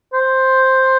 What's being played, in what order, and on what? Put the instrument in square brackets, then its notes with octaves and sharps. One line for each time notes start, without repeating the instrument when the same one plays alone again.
[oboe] C5